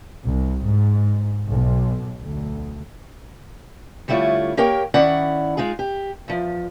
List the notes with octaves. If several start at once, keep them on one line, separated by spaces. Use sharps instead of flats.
C2
G#2
B1
D2
D3 G3 A3 E4 F4 C#5
A#3 G4 A#4 C#5 G5
D#3 C#4 E4 D5 F#5
G#3 D#4 F4 G#4
G4
E2 F3